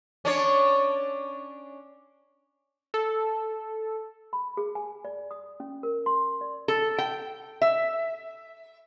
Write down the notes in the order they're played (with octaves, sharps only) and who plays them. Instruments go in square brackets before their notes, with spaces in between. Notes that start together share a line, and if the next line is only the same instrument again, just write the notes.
[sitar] C#4 D4 C#5
[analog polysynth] A4
[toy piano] B5
G#4
G#5
D5
D#6
C#4
A#4
C6
D5
[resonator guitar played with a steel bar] A4
G5
E5